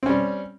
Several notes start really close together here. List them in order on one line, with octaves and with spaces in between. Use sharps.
C4 C#4 G3